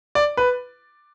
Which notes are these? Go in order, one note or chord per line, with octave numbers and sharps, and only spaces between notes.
D5
B4